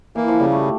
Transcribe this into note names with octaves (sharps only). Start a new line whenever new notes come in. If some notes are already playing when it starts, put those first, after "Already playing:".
E3 A#3
F3
C#3 G3
A3